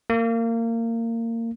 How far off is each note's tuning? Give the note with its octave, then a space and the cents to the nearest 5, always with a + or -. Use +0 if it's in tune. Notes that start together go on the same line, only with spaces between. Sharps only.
A#3 -25